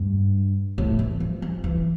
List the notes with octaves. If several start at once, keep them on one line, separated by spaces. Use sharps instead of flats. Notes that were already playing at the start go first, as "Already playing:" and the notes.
Already playing: G2
A2
E3
F3
F3
E3